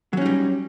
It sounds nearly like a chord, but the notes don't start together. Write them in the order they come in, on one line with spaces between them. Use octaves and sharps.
F#3 C#4 D#4 G3